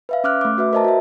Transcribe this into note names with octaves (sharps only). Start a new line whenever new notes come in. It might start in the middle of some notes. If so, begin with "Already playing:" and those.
B4 E5 F5
C#4 D6 F6 F#6
A3 D6
F#4 B4 E5
A#4 C5 D#5 E5 A5 A#5
F#4 E5